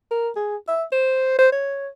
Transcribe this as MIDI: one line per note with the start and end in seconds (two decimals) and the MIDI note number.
0.11 0.29 70
0.36 0.57 68
0.68 0.84 76
0.92 1.37 72
1.39 1.51 72
1.53 1.88 73